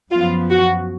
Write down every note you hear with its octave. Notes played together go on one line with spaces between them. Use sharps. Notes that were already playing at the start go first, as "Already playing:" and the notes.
F#2 F3 B3 F4
F#4